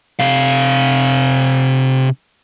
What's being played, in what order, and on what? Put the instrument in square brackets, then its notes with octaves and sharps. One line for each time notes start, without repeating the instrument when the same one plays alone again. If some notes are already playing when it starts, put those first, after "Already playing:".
[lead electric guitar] C3 F5